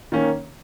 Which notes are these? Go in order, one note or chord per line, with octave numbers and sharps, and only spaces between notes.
D#3 A#3 C#4